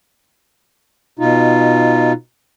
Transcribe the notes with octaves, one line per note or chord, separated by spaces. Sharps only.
B2 D#4 F4